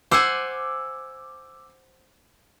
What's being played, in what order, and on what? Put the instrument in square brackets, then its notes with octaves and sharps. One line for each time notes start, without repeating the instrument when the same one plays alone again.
[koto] C5 F#5 G#5 [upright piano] D6 E6